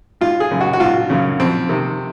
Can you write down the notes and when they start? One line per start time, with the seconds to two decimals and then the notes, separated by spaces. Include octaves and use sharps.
0.21 G#1 F4
0.40 G#4
0.51 F#2 C#3
0.61 F#4
0.73 F#4
0.80 G#1 F4
1.10 F#2 C#3
1.40 F2 C4
1.69 C3 D#3